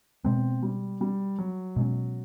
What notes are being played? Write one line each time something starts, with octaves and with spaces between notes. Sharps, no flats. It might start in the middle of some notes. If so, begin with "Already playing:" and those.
B2 G#3 B3 C4
G3
G3
F#3
B2 G#3 C#4